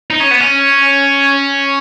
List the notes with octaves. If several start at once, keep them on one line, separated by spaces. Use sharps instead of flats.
D#4
C#4
B3
C#4